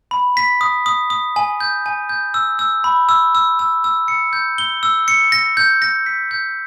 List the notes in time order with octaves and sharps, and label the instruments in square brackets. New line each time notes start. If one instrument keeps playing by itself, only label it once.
[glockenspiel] B5
B6
D#6
D#6
D#6
G#5
G6
G#5
G6
E6
E6
B5
E6
E6
E6
E6
C#7
G6
G7
E6
C#7
A#6
G6
A#6
B6
G6